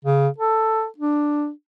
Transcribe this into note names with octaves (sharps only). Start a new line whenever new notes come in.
C#3
A4
D4